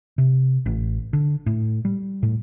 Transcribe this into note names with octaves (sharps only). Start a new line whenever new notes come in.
C3
A1
D3
A2
G3
A2